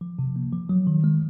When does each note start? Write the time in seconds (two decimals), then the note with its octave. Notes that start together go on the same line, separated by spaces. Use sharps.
0.01 F3
0.19 C3
0.36 A#3
0.53 F3
0.69 F#3
0.87 D#3
1.04 G#3